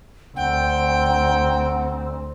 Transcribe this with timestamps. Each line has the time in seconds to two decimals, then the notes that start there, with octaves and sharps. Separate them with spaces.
0.36 D2 C4 F#5 G5